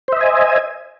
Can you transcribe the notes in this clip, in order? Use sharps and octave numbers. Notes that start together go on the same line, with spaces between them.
C5 D#5 E5 G#5